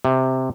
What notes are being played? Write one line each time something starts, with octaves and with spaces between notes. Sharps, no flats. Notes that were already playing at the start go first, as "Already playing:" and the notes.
C3